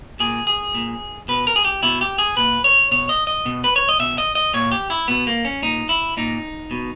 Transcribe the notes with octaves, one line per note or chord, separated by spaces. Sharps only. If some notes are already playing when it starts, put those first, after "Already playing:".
A#2 G#4
G#4
A#2
B2 B4
A#4
G#4
G4
B2 E4
G4
G#4
A#2 B4
C#5
B2 C#5
D#5
D#5
B2
B4
C#5
D#5
B2 E5
D#5
D#5
A#2 C#5
G4
E4
B2 B3
A#3
C#4
A#2 D#4
E4
A#2 D#4
B2